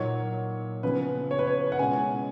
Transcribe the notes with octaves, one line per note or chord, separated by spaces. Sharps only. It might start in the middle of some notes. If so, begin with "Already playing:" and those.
Already playing: A#2 F#3 A#3 D#4 C#5
C#3 F3 B3 B4
C#5
B4
C#5
F#5
B2 G#3 C#4 F4 G#5